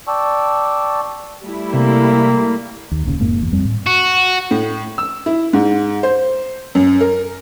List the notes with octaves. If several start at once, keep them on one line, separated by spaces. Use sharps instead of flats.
D5 G5 A5 C#6 E6
G3 A3 E4
C3 A#3
D#2
D#1 D#2 C#3
E1 F2 G#2 A#3
G1 E2
F2 G3 C4
A2
F#4
A2
E6
E4
G#2
C5
F#2
A#4